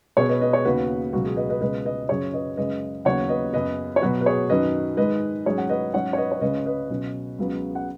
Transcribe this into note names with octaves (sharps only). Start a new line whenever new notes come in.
B2 B3 G#4 C#5
B4 D#5
B4 D#5
G#4 C#5
D#2 C#3 B3 F#4 B4
C#2 B2 F#3 F#4
G#4
B4 D#5
B4 D#5
C#2 B2 G#3 B4 D#5
B4 D#5
F#2 C#3 F#3 G#4 C#5
B4 D#5
F#2 C#3 G#3 B4 D#5
D#2 C#3 F#3 B3 C#5 F#5
B4 D#5
F#2 C#3 B3 B4 D#5
C#5
B2 F#3 B3 F#4 B4
B4
G#4 C#5
F#2 D#3 F#3 C#4 B4 D#5
G#2 D#3 G#3 B4 D#5
G#2 F#3 C#4 G#4 C#5
F#5
B4 D#5
G#2 F#3 C#4 C#5 F#5
C#5
B4 D#5
C#5
C#2 C#3 G#3 C#4 B4 D#5
B4 D#5
B2 F#3 C#4
C#2 C#3 F#3 B3
F#5